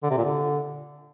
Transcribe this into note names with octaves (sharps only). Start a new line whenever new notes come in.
D3
C3
A#2
D3